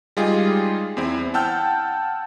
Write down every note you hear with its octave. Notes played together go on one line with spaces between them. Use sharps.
G3 G#3 D#4 F4 G#4
E2 C4 E4
F#5 G5 A5 E6 F6 G6